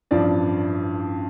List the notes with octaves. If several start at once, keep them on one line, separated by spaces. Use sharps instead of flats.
A1 G2 F3 D5